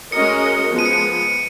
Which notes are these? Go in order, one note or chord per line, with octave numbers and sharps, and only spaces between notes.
G#3 C#4 F#4 A#4 D#5 C#7
F3 G#3 B3
D#7
C#7
D#7